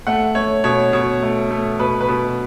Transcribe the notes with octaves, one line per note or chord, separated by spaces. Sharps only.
A3 F#5
A3 C#5
B2 C#5
B2 C#5
A3
A3
B2 B4
B4
B2